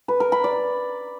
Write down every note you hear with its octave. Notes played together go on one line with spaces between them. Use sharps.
B4
A#4
B5
D5